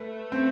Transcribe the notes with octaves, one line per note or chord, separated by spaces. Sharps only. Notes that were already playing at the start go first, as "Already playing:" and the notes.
Already playing: A3 B4
C4